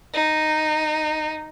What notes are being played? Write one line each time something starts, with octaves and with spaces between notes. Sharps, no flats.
D#4